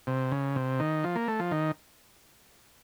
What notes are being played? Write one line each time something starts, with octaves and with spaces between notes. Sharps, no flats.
C3
C#3
C3
D#3
F3
A#3
A3
F3
D#3